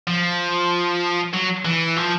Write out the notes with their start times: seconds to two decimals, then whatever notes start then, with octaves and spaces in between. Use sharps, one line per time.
0.07 F3
1.33 F#3
1.65 E3
1.97 F3